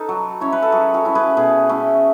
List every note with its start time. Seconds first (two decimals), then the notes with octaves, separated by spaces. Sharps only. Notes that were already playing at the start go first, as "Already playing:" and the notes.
Already playing: D#4 A4 B4
0.09 F#3
0.41 C#4 E4 C#5
0.52 B4
0.62 A4
0.72 F#3 G#4
0.94 F#4 A4
1.05 C#4 E4
1.15 G#4 B4
1.37 B2 G#4
1.69 A3 C#4 E4